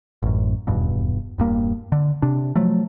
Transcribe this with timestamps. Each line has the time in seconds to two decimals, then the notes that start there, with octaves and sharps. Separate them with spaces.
0.22 A1 F#2
0.67 D#1 E2 G2 B2
1.38 E1 G2 A#3
1.92 D3
2.22 C3 D4
2.56 F3 F#3 A3